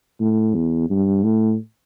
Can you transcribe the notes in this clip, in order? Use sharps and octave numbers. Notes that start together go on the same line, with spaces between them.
A2
E2
G2
A2